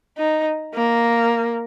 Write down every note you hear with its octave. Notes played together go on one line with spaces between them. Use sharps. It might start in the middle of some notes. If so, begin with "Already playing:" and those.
D#4
A#3